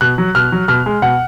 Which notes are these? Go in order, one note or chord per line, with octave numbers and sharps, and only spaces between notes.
B2 F#6
F#3
B2 F6
F#3
B2 F6
G#3
B2 F#5